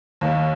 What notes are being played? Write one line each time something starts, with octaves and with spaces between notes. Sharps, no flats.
D#2